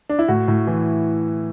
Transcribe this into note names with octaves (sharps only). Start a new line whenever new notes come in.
D4
E4
A2 F#4
A2
E3